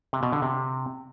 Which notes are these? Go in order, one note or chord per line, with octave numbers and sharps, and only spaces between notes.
C3
B2
D3
C3